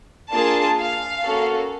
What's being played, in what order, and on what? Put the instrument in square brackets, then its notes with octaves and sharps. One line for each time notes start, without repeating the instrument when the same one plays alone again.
[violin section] A#3 D4 F4 G#4 A5
F5
A#3 C#4 F#4 A4